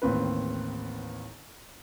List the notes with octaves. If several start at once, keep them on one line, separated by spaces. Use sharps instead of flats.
A1 D#2 C4 B4